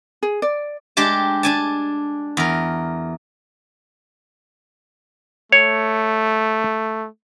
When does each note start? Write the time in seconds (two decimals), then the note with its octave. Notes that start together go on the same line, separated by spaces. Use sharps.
0.23 G#4
0.42 D5
0.97 G#3 D4 G4 A5
1.43 D4 G#5 A5
2.37 E2 A#4
5.52 A3 C#5